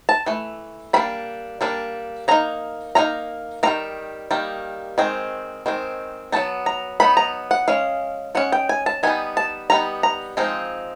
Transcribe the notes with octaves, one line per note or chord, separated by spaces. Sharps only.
A5
E3 A3
G3 A#3 D4 B5
G3 A#3 D4
F#3 A#3 D#4 A#5
F#3 A#3 D#4 A#5
D#3 G3 A#3 A#5
D#3 G3 A#3
D#3 G#3 C4
D#3 G#3 C4
F#3 B3 D#4 A5
A#5
F#3 B3 D#4 B5
A#5
F#5
G#3 C#4 F5
G#3 C#4 F#5
G5
G#5
A5
G3 B3 D#4 G#5
A5
G3 B3 D#4 A#5
A#5
F3 G#3 C4 D#4